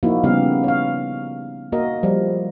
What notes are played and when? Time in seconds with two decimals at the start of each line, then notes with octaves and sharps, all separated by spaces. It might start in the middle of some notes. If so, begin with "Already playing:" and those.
0.03 F3 A#3 D#4 E4 F#4
0.23 C#3 G3 B3 G4 F5
0.64 C#5 F5
1.72 A#3 F#4 A#4 D#5
2.03 F3 G3